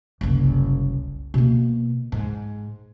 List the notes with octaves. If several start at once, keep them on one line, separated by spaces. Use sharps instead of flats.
F#1 C2
B2 A#3
G#2